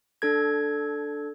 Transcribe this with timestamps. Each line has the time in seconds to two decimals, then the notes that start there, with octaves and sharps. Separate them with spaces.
0.22 D4 A4 G#6